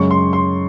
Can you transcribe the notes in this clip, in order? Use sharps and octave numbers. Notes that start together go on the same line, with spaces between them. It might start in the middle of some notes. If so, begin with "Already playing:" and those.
Already playing: F#2 C#3 G#3 C#6
C6
C6